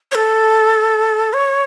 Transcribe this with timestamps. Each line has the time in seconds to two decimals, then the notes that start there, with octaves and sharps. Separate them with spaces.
0.12 C#5
0.15 A4
1.33 C#5